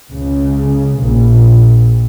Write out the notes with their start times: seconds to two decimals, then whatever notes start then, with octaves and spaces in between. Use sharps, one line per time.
0.11 C#2 C#3
0.99 A#1 A#2